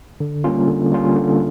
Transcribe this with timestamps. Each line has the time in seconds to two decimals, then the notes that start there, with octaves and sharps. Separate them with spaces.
0.20 D3
0.44 G3 A#3 C#4 F4
0.67 D3
0.92 G3 A#3 C#4 F4
1.15 D3